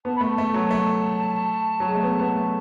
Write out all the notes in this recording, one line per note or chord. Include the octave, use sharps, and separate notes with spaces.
B3 A5
B5
A3 A5
A3
F#3
A3
F#3
G#3
A3
B3
B3
A3